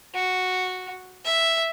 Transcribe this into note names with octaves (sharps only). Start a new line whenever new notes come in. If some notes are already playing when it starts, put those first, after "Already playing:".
F#4
E5